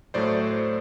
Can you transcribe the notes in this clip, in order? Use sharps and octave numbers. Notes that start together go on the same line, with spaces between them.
A2 F#3 A3 C5 D5